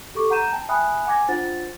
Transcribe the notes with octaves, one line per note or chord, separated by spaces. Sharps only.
G4 A4 C#6 D6
F#5 A#5 G6 D#7 E7
G5 A5
E5 G5 G#5 B5 D#6 F#6
F#5 G#5 D6 G#6 A#6
D4 F4 C5 F#5 A6